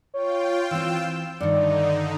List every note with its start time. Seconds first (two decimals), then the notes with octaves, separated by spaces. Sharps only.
0.14 F4 C#5 G5
0.71 E3 C4 E6
1.41 G2 D3 D#3 D#4 D5